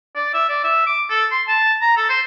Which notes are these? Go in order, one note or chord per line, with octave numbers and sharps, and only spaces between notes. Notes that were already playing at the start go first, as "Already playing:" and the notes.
D5
E5
D5
E5
D6
A4
C6
A5
A#5
A4
C5